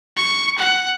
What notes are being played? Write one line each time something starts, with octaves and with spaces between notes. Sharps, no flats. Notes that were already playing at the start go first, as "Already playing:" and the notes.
C#6
F#5